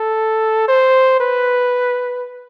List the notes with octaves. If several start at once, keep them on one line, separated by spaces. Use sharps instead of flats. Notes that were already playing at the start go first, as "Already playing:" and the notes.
Already playing: A4
C5
B4